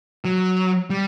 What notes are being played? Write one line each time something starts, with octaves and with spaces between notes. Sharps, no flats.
F#3
G3